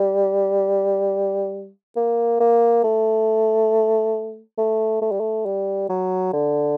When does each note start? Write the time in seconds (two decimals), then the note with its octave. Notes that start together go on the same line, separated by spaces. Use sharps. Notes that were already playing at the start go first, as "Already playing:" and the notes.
Already playing: G3
1.96 A#3
2.40 A#3
2.84 A3
4.58 A3
5.01 A3
5.11 G3
5.20 A3
5.45 G3
5.89 F#3
6.33 D3